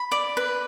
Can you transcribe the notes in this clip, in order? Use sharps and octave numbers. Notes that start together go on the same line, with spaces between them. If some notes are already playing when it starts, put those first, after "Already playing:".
Already playing: B5
D5
B4